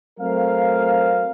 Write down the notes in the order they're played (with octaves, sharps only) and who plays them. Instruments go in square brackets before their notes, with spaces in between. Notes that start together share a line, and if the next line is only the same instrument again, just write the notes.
[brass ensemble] F#3 A3 C4 A#4 F5